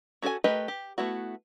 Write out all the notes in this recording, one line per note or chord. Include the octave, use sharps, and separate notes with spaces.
C#4 F#4 A4 A#4 G#5
A3 G4 A#4 B4 D#5
G4
A3 B3 E4 F#4